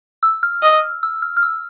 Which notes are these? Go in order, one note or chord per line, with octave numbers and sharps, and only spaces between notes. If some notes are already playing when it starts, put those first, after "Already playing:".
E6
F6
D#5
E6
F6
F6
E6